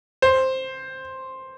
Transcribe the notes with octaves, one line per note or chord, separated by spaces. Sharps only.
C5